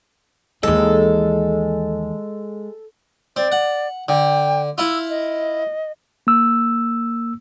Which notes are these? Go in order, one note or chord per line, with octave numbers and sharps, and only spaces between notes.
D#2 E3 G#3 A4
C4 D5
F#5
D3 G5
E4 F4 E6
D#5
A#3 E6